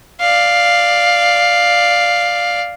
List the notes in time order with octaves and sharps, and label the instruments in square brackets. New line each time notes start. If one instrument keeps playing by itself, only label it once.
[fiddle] D5 F5